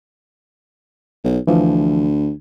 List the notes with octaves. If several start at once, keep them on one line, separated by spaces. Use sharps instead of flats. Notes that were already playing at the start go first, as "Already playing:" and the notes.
B1
D2 E3 F3